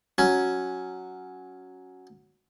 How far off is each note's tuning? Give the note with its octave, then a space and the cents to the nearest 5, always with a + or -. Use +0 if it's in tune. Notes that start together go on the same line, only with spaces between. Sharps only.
F#3 +0 C#4 +0